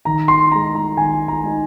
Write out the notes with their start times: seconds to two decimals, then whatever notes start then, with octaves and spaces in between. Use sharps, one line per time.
0.05 D#3 A#5
0.28 C6
0.51 G#3 D#4 A#5
0.75 A#5
0.97 D#3 G#5
1.28 A#5
1.44 G#3 D#4